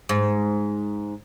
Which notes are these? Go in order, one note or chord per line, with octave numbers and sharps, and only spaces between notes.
G#2